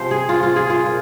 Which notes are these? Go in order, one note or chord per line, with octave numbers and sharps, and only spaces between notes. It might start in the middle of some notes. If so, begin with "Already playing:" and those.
Already playing: C3 F3 G#3 C5
G#4
F4
F4
G#4
F4
A#2